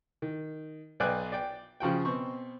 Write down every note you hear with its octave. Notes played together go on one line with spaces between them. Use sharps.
D#3
B1 D5 G5 G#5 F#6
D5 G5
C#3 F3 F#4 G5
B2 C4 C#6